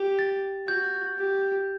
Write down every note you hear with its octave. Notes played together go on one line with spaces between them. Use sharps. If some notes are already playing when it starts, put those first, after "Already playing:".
Already playing: G4
A6
F#4 G6
G4